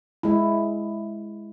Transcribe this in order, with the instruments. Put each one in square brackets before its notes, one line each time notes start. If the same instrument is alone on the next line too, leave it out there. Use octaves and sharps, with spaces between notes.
[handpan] G#3 E4